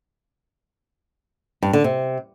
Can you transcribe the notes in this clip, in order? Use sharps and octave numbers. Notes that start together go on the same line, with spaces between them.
G2
D3
C3